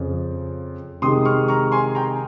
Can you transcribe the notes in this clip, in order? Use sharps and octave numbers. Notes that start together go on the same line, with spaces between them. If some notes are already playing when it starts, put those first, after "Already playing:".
Already playing: F2 C#3 F3
C3 D#3 G#3 C6 D#6
C#6 F6
A#5 C#6
G#5 C6
G5 A#5